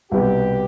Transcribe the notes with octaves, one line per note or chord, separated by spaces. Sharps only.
C2 B2 G3 B3 G4